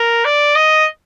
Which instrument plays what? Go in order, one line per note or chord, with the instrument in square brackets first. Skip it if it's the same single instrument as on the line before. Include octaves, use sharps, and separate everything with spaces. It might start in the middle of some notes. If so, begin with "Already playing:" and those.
Already playing: [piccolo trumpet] A#4
D5
D#5